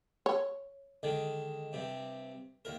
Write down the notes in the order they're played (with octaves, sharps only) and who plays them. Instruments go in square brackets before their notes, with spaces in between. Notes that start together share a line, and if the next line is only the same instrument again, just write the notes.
[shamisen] C#5
[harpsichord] D3 D#3 G#3
G2 C3
D#2 A#4